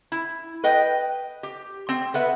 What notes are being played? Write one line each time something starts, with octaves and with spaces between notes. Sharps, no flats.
E4
B4 D#5 G5
G4
C4
B3 B4 E5